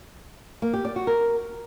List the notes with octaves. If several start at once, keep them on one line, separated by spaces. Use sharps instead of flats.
A#3
G4
D5
F#4
A#4